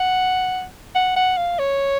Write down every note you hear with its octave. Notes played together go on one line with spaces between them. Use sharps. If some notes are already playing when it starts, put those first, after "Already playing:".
Already playing: F#5
F#5
F#5
F5
C#5